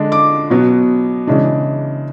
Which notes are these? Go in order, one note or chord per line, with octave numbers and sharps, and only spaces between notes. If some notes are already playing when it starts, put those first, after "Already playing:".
Already playing: D3 G#3 D4
D6
B2 F#3 B3
C#3 E3 G#3 D4